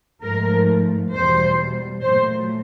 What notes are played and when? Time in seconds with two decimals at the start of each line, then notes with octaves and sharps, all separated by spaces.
0.23 G#2 F3 A3 A#4
1.12 E2 B2 G3 C5
2.01 A#2 F#3 A3 C5